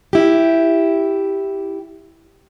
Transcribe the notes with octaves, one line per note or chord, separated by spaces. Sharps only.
E4 G4